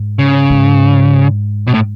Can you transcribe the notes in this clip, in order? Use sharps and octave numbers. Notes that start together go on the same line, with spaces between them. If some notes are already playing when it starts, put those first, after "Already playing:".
Already playing: G#2
C#3
G#2
B2
A2